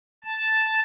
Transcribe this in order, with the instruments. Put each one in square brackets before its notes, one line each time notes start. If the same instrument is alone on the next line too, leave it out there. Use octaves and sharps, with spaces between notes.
[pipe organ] A5